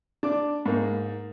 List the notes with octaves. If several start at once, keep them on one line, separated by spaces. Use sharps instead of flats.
D4 D6
G#2 A#3